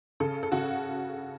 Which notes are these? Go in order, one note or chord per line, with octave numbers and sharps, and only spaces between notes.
C#3 A4
A4
C#3 F#4